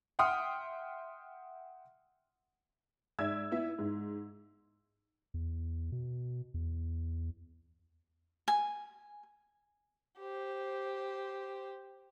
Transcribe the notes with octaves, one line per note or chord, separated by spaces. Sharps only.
E5 F#5 G5 C6 D#6 F6
G#2 D5 E5 E6 G#6
B3 E4 E5
G#2
E2
B2
E2
G#5
G4 C5